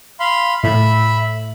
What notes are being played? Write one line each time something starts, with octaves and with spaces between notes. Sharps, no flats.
F5 B5 C6
A2 E5 B5